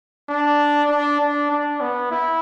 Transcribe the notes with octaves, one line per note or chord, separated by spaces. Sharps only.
D4
D4
D4
D4
B3
E4